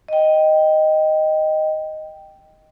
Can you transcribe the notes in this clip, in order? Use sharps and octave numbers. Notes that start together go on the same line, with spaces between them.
D#5 G5